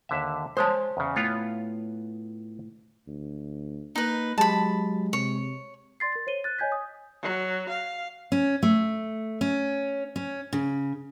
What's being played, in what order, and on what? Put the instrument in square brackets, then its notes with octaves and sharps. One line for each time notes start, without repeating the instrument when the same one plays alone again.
[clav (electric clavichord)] D#2 D3 E5
[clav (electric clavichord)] G#3 [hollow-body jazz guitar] C5 C#5 A5
[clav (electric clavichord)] E2 C#3
[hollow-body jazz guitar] A2 [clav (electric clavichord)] B3 F4 C#5
[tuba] D2
[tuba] A#3 [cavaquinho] D#4 B4
[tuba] F#3 [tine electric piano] G#3 G4 [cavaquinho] A5 B5
[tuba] C3 [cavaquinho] C#5
[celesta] D5 C6 A6 C7
A#4 A6
C5 C#5 D#7 G7
F#6 A6
C#5 D#5 G#5 G6 G#6 B6
D#6
[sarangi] F#3
F5
[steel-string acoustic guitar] C#4
A3
C#4
C#4
C#3